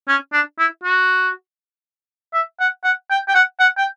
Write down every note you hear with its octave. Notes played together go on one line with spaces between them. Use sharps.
C#4
D4
E4
F#4
E5
F#5
F#5
G5
G5
F#5
F#5
G5